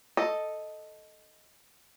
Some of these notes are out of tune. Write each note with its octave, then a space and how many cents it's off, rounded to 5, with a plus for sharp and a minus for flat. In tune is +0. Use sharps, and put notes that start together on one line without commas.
A4 +0 D#5 +0